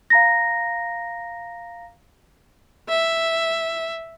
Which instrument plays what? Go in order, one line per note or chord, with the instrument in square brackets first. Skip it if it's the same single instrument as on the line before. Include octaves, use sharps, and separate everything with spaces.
[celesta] F5 A#5 A#6
[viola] E5